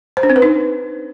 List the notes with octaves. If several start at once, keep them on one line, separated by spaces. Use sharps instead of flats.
C5
D4
C4
B4
D#4